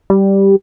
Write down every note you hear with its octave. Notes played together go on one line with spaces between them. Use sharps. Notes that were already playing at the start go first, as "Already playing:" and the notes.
G3